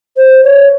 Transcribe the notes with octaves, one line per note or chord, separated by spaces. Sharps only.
C5
C#5